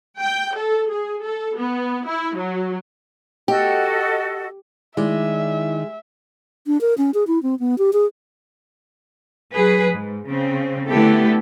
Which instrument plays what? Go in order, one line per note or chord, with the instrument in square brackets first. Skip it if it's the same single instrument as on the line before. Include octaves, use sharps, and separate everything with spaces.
[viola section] G5
A4
G#4
A4
B3
E4
F#3
[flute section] F#4 A4 D#5 [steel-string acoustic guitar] G4
[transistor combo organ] D#3 [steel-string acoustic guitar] G#3 [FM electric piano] E4 D5 [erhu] E5
[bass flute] D4
A#4
C#4
G#4
E4
C4
B3
G4
G#4
[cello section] F#3 G#4 B4
G#2
C#3 C4
D3 A3 B3 E4 G4 A4